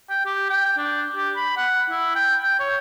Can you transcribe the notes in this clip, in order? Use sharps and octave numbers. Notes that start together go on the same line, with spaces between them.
G5
G4
G5
D4
G4
B5
F#5
E4
G5
G5
C#5